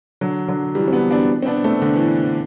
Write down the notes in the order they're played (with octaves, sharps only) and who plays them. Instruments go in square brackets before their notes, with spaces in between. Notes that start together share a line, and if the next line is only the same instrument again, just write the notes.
[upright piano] D3 F#3
D3 F#3
E3 G3
C4
G3 B3
B3 D4
C4
B3 D4
A3 C4
D3
E3
E3